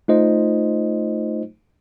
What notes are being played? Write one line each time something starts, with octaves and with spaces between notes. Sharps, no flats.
A3 D#4 F4 C5 D#5